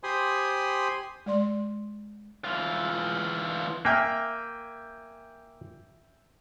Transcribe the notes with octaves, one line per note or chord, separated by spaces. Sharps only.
G4 C5 G#5 B5 C6 D#6
G#3 D5 C6
E3 F4
A#3 E5 G5 G#5